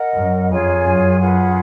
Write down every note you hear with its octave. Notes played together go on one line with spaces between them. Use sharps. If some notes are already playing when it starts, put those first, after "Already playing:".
Already playing: A#4 D#5 F#5
F#2
F2 F4 G#4 C#5 G#5
F#2
F4 G#4 B4 F#5